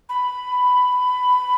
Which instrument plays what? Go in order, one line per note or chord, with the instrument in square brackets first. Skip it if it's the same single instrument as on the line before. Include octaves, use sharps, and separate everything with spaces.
[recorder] B5